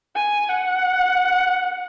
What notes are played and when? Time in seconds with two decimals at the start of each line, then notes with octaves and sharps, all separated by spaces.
0.15 G#5
0.49 F#5